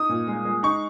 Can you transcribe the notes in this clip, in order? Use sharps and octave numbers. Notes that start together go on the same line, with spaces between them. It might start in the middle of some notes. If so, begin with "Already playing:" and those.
Already playing: D#4 D#6
A#2
G#3
G#3
D#4 C#6